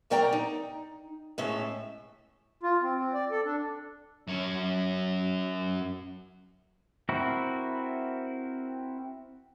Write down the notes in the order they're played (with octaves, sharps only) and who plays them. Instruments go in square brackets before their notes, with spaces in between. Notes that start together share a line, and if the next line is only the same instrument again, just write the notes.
[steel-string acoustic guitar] A#2 F#3 A#4 D5 G5 A#5
D#4
A2 G#3 C#4 E5
[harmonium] F4
C4
C4
D5
A4
D4
[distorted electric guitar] F#2 C#5
[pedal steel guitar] C4 E4 F#4 A#4